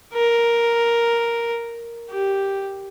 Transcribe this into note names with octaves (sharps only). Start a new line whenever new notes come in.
A#4
G4